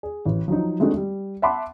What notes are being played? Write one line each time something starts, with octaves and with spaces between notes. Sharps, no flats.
G#4
A1
F3 F#3 D#4
G#3 A3 C4 D4 D#4 F#4
G3
E5 F#5 A5 B5 C6 D6